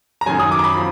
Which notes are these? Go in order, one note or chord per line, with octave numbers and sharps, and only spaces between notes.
A#5
F#2 D#3 F#3 G#5
D#6
D6
A#5
B5
F3